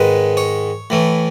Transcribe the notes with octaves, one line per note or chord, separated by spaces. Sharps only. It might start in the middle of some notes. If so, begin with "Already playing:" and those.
Already playing: G#2 D#3 G#3 B4
C#5
A2 E3 A3